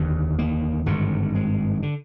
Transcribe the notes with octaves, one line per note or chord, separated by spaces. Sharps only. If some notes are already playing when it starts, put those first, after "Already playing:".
Already playing: F1 D#2 D3
A#3
G#1 G2 D3
G#3
D3